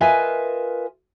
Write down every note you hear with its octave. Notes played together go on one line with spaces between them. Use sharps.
F4 A#4 B4 D#5 E5 G#5